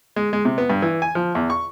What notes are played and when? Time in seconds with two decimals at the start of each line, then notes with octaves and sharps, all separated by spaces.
0.16 G#3
0.33 G#3
0.45 C3
0.58 B3
0.70 G2
0.82 E3
1.02 G#5
1.15 F3
1.35 E2
1.50 C#6